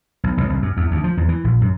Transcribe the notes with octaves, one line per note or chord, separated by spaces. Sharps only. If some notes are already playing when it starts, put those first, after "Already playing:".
B1
B1
C2
F#2
E2
D2
F3
E2
E3
A#1
F#2